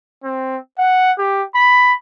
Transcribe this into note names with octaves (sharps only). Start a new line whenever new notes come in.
C4
F#5
G4
B5